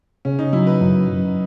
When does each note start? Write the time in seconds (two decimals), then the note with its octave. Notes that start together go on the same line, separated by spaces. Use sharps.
0.25 C#3 C#4
0.39 D#4
0.53 F#3 E4
0.67 B4
0.81 F#2
1.08 F#2